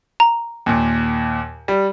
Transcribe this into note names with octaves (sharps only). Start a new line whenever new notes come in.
A#5
D#2 A#2
G3